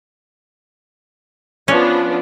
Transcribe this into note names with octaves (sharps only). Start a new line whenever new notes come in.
F3 B3 C#4 D4